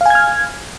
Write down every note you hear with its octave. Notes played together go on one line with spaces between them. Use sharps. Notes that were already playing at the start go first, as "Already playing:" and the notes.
F5 G#5 F6 G#6